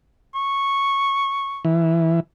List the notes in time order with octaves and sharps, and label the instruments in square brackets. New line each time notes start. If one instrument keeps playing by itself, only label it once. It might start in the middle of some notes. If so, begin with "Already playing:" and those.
[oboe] C#6
[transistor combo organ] E3